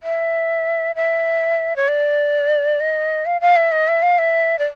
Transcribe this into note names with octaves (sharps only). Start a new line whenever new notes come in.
E5
E5
C#5
D5
D#5
F5
F5
E5
D#5
E5
F5
E5
D5